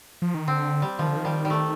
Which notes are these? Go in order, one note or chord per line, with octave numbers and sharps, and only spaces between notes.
F3
D#3
D3 C4
G3
D#3 F3
D3
D#3
G3
G3
A3